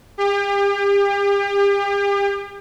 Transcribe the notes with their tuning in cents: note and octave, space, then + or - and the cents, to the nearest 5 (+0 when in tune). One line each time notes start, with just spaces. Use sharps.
G4 +40